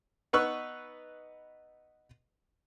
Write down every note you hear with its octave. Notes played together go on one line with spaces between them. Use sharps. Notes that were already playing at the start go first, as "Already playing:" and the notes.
B3 D#4 B4 C#6 E6 F#6